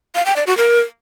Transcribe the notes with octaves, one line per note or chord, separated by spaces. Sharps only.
F5
G5
D5
F#4
A#4